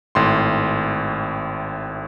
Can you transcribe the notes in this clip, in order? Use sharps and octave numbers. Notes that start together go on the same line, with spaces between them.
G#1 A2 C6